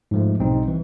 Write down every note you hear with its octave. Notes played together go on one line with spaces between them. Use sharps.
G#2 F3 A3
B1 B2 G3 C4 D#4
E3